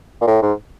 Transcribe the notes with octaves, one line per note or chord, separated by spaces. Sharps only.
A#2
A2
G#2